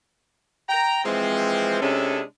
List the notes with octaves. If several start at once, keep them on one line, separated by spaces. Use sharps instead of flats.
G5 A#5
E3 F3 G#3 C4
C3 G#3 C#4 D4 E4 A4